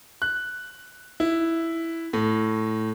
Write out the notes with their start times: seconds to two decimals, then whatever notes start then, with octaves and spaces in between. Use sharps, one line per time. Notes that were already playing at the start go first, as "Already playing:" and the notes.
0.22 F#6
1.20 E4
2.13 A2